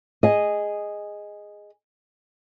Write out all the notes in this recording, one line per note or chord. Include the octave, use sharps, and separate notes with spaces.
G#4 D#5